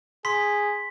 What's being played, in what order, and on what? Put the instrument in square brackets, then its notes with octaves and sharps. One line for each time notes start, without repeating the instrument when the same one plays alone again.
[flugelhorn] G#4 [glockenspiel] C6 B6